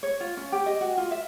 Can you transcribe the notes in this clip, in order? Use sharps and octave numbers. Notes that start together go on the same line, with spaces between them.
C#5
F4
C#4
G4
D#5
F#4
F4
E5